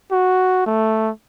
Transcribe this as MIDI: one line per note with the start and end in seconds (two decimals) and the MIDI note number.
0.12 0.65 66
0.66 1.10 57